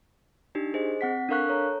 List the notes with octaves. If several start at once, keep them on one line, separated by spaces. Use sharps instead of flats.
D4 D#4 G4
G#4 C5 D#5
C4 F#5 B6
D4 A4 A#4 F5 C#6 F#6
A4 C#5 A#5